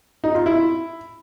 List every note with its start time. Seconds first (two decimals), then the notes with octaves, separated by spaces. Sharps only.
0.24 D#4
0.35 F4
0.46 E4